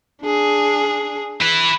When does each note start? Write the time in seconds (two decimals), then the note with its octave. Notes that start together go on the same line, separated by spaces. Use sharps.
0.24 D4 G#4
1.42 E4 B4